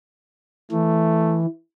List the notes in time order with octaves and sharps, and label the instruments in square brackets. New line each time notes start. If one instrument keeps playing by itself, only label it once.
[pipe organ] E3 [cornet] A3